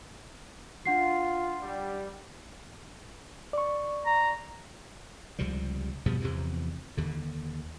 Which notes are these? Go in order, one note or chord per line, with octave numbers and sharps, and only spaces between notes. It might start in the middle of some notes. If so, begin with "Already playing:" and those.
D4 F4 F#5 C7
G3
D5 C#6
A#5
C#2 C3 F3 G3
G2 B2 F3 B3
E2 C3 E3 F3
D#2 D3